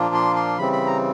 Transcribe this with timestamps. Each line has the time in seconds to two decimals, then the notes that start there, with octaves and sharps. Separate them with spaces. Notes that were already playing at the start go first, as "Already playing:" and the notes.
Already playing: A#2 F3 A#3 D4 F4
0.14 C6
0.36 C6
0.58 C#3 E3 G3 C4 B5
0.73 B5
0.86 A#5